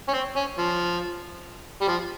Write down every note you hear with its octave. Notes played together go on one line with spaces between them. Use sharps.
C#4
C4
C#4
F3
G3
F3